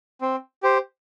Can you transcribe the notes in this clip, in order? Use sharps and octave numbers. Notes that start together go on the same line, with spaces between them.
C4
G4 C5